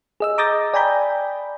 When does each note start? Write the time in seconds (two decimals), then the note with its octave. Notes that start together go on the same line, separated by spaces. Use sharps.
0.20 G#4 D#5 E6
0.38 A#5 D6 D#6 G6 A6 A#6
0.74 D5 G5 G#5 A#5 B5 G6